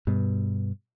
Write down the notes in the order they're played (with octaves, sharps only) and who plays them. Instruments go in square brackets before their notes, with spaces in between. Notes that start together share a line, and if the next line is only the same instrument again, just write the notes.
[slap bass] G2 B2